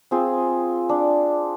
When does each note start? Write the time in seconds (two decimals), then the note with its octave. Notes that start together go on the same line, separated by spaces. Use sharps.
0.11 C4 F4 G#4
0.89 D4